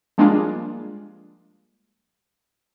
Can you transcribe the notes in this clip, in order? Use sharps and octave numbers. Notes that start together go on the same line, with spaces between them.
F3 G3 G#3 A#3 D4 F4